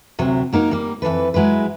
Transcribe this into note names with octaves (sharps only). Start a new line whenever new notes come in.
D2 C3 F#3 C5
F#3 A#3 D#4 A#4
G3 A#3
F2 E3 A4 B4
F#3 G#3 E4 B4